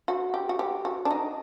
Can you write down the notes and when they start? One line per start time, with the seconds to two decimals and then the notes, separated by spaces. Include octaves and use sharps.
0.08 F#4
0.34 G4
0.49 F#4
0.59 G4
0.85 F#4
1.05 D4
1.11 D#4